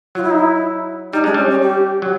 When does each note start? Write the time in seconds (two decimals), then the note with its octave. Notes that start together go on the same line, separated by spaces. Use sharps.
0.15 F#3 F4
0.23 E4
0.31 D#4
0.39 E4
1.13 G3 D#4
1.24 G#3 D4
1.34 G3 C#4
1.50 C#4
1.62 G4
2.02 F#3